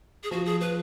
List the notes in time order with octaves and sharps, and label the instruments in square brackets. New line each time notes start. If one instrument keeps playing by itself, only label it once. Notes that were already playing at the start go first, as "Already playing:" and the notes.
[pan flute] G#4
[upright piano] F3 [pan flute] F#4
[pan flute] G#4
[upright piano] F3 [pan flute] B4